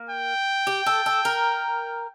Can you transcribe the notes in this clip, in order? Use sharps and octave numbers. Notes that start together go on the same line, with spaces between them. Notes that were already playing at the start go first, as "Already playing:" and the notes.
Already playing: A#3
G5
G4
A4
A4
A#4